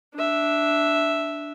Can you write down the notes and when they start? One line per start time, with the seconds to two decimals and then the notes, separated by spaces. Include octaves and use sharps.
0.14 D4 E5